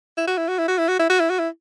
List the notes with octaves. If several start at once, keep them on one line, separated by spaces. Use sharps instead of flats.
E4
F#4
E4
F#4
E4
F#4
E4
F#4
E4
F#4
E4
F#4
E4